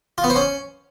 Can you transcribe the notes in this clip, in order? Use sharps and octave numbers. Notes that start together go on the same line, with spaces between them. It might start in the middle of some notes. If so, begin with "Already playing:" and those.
F4
B3
C5
C#4